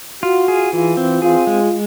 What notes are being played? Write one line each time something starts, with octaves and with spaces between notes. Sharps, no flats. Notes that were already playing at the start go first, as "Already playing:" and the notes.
F4 F#4
G#4
E3 F4
C4
F4 G#4
G#3